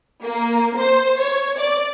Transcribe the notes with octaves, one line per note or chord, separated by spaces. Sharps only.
A#3
C5
C#5
D5